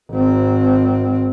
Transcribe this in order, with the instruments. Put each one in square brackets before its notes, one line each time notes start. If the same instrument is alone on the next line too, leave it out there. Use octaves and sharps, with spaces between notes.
[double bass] G#1 C4